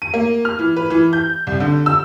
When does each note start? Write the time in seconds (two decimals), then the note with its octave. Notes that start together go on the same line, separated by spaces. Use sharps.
0.02 D#7
0.14 A#3
0.45 F6
0.59 E3
0.76 B4
0.90 E3
1.13 G6
1.47 C2
1.60 D3
1.86 E6